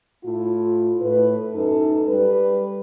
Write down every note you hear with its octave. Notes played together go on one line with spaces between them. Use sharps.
A2 E4 F4
A2 B4
F#2 D#4 A4
G3 B4